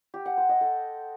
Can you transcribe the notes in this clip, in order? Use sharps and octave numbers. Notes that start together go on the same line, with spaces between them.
G4
F#5
C5
D#5
A4